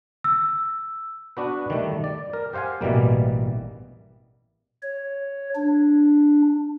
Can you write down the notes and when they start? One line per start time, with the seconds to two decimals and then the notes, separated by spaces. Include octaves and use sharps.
0.24 E6
1.37 B3 D4 F#4 B4
1.70 D#3 G3 A3
2.04 D5
2.33 A#4
2.53 G4 C5 F5 F#5 G#5
2.81 A1 B2 E3 G3 A#3
4.83 C#5
5.55 D4